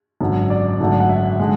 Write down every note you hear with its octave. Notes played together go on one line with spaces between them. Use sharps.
G#1 F#2 D3
D5
G#1 F#2 D3 A3
F#5
E5
D3 G#3